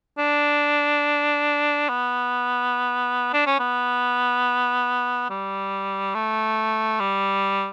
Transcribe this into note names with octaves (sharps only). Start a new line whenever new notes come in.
D4
B3
D4
C#4
B3
G3
A3
G3